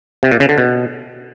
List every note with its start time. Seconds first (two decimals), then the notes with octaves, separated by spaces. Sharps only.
0.23 C3
0.32 A#2
0.40 C#3
0.49 D3
0.58 B2